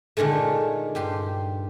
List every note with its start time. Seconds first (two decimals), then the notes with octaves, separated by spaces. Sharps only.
0.17 A#2 D3 D#3 G#3 A3
0.95 G2 G4 C6